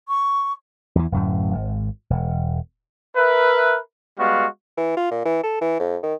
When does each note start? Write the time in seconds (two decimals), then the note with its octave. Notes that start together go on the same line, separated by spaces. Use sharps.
0.08 C#6
0.95 E2 E3
1.12 D1 F#2 A2
1.54 G#1
2.10 E1
3.16 A#4 B4 E5
4.18 G3 G#3 B3 F#4 F5 C#6
4.77 E3
4.97 F4
5.11 A#2
5.25 E3
5.44 A4
5.61 E3
5.80 F2
6.03 D#3